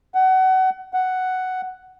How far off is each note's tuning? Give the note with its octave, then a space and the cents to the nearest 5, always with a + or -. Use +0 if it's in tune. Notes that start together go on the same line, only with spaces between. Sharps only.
F#5 +25
F#5 +5